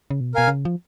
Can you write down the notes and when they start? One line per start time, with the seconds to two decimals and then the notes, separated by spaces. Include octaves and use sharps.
0.10 C#3
0.21 B2
0.34 B2 A#4 F5 G#5
0.48 C#3
0.65 F3